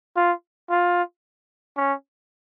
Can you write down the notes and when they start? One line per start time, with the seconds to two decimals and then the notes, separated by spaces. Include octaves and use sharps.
0.16 F4
0.70 F4
1.77 C#4